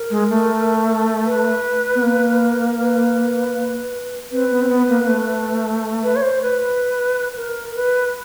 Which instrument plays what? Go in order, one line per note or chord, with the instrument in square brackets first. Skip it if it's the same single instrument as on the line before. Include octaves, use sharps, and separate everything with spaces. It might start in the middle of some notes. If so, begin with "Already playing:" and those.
Already playing: [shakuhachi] A#4
[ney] G#3
A3
[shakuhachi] B4
[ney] B3
A#3
[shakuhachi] B4
[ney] C4 [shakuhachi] B4
[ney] B3
C4
B3
A#3
A#3
A3
[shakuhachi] B4
C#5
C5
B4
A#4
B4